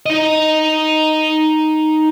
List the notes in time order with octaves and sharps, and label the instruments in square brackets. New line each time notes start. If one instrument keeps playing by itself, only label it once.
[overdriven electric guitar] D#4 D#5